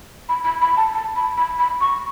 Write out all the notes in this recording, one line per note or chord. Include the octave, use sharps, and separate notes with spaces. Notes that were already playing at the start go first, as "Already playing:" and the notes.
B5
B5
B5
A5
A5
B5
B5
B5
C#6